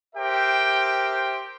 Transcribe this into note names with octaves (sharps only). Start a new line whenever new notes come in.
G4 A#4 C5 E5 G5